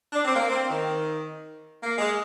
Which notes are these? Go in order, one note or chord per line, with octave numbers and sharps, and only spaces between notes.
D4
C4
A#3
C4
D#3
A#3
G#3